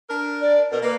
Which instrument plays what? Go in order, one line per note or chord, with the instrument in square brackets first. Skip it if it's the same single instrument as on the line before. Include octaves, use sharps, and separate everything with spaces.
[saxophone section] D4 A#4
[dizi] D5
[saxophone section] B2 [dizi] A#4
[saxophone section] A#3 [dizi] B4